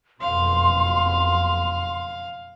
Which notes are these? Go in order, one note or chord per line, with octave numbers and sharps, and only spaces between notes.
F#1 F2 B2 F5 C6